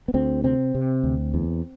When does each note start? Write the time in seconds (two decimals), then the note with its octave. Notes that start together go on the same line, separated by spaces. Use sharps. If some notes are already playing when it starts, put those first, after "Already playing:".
0.08 B3
0.14 D2 C4
0.43 C3 C4
0.75 C3
1.03 D2
1.34 E2